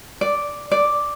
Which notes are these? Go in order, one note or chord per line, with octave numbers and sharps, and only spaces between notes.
D5
D5